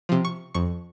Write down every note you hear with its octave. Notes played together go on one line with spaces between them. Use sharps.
C3 F3
C#6
F2 C#6